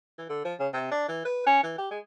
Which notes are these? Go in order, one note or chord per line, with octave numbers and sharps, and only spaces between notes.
E3
D3
F3
C#3
C3
D4
E3
B4
C#4
E3
G4
G#3